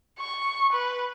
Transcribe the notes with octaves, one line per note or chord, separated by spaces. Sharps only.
C#6
B4